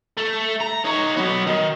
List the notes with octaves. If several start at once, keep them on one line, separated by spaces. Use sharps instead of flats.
A3
A#5
D#4 C#5
F#3 B3
D#3